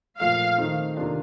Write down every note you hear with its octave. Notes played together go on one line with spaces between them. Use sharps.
A#2 F3 A3 F5
D#3 A3 C4 D#4
C3 D#3 A#3 D4 F4